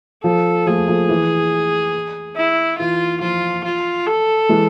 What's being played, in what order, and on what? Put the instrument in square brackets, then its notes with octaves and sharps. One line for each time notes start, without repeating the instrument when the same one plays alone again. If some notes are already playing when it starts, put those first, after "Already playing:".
[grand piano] F3 [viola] A4
[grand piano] F3 A3 [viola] G#4
[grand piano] F3 A3
E3
[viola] E4
[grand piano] E3 [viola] F4
[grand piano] F3 [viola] F4
[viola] F4
A4
[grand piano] E3 G#3